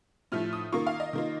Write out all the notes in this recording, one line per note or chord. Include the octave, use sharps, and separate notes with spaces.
A2 F3 A3 F6
D#6
D#3 A#3 F4 C#6
F5
D#5
D#3 A#3 F4